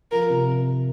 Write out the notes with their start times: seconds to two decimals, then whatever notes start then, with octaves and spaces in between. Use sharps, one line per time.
0.12 F3 A#4
0.30 C3